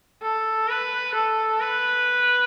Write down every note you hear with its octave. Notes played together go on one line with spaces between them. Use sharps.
A4
B4
A4
B4